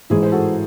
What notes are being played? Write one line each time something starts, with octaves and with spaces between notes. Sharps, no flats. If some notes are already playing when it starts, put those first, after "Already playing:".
A1 G#2 E3 G#3 E4 G#4
C5
F#4 A4